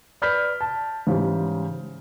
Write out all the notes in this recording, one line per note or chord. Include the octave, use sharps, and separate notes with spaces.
B4 D5 B5 F6 G6 B6
A5
G#2 C#3 E3 G3